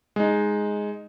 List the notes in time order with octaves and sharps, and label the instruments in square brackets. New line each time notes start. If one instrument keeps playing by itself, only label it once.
[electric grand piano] G#3 D#4